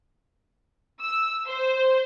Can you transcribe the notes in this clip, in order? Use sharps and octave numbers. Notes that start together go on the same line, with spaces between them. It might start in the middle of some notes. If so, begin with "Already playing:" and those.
E6
C5